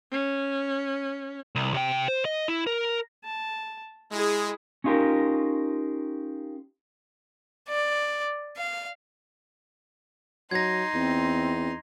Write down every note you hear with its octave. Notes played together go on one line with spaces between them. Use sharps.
C#4
C2
C3 G5
C5
D#5
E4
A#4
A5
G#3 E4 G#4
C#4 D#4 F4 G4 A#4
D5
F5
F#3 D#4 C6 G#6 A#6
E2 C4